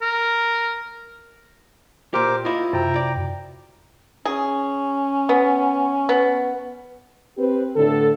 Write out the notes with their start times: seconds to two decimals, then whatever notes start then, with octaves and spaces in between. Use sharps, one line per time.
0.02 A#4
2.14 A#2 G4 A#4 C5 D6
2.45 E4 F4 D#5
2.73 F#2 C3 G5 A#5
2.96 D5
4.25 C#4 G#4
5.29 B3
6.09 B3
7.38 C4 G4 B4
7.76 A2 D3 A4